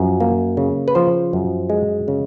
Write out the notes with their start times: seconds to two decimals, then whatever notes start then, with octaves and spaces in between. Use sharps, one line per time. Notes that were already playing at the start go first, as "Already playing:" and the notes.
Already playing: F#2 F3
0.20 A#3
0.57 C#3
0.88 B4
0.95 F3 C5
1.33 F#2
1.70 G#3
2.08 C#3